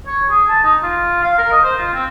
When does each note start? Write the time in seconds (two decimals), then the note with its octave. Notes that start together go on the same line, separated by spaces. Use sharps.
0.07 C#5
0.30 G#4
0.49 A5
0.64 D#4
0.83 F4
1.23 F5
1.38 A#4
1.52 D#5
1.63 C5
1.78 F4
1.93 C4